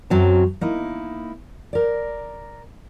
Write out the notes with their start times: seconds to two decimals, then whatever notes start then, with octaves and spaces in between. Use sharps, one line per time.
0.10 F#2 F#3 C4 A5
0.61 A#3 D#4 E4
1.73 A#4 D5